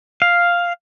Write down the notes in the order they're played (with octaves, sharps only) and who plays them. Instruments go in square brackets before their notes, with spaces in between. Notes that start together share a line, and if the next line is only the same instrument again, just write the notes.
[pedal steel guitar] F5